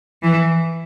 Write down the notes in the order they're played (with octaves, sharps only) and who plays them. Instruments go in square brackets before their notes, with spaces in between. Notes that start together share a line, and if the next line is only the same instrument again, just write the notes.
[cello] E3